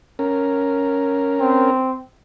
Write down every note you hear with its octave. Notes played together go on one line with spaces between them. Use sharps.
C#4 A#4
C4